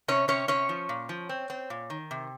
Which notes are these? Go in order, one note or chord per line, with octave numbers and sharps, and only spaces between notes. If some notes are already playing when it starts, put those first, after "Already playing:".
C3 C#4 C#5
C3 C#4 C#5
C3 C#4 C#5
F3
A#2
F3
C4
C4
A#2
D#3
C3